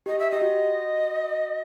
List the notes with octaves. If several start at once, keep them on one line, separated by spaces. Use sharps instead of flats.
G4 D#5
E5
G4 D#5
F#4